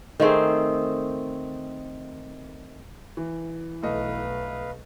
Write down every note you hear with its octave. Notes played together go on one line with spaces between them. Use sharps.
D#3 A3 C4 G#4
E3
B1 A3 B4 D#5 F5